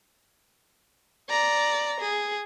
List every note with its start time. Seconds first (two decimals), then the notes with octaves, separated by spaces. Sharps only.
1.30 D5 A#5
2.01 G#4